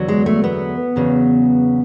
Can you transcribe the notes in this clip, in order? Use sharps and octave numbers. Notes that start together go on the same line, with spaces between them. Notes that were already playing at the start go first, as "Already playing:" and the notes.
Already playing: E2 D3 F#3
G#3
A3
B3
E2 C#3 F#3